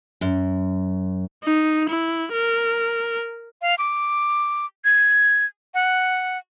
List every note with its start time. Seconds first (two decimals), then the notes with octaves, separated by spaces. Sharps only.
0.21 F#2
1.44 D#4
1.89 E4
2.33 A#4
3.62 F5
3.78 D6
4.85 G#6
5.74 F#5